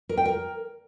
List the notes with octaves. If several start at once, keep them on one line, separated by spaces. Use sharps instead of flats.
A#4
G5
A#4